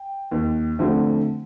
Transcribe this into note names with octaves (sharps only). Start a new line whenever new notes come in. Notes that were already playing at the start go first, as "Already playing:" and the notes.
Already playing: G5
D#2
D3 F3 A3 C4